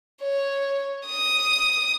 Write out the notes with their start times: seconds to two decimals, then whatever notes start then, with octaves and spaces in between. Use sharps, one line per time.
0.22 C#5
1.06 D#6